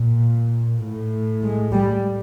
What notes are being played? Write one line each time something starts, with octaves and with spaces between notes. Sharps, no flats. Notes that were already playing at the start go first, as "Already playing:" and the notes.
Already playing: A#2
A2
G#3
G3